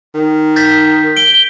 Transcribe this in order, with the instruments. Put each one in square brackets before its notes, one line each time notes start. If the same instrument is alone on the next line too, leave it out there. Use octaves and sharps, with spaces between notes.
[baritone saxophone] D#3
[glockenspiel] G6 A6 B6
[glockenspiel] D7 [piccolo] G7